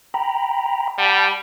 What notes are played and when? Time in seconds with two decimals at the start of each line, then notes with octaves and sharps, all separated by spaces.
0.14 G5 A#5 B5
0.98 G3 F#5 A5 B5